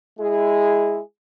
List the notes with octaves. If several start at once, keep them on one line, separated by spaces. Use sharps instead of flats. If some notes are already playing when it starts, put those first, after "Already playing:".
G#3 E4 G#4